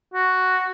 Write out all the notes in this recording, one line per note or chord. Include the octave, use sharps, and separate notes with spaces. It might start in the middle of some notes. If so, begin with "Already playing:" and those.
F#4